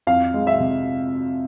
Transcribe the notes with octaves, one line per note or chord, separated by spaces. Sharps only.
F2 F5
G#3
E5
C3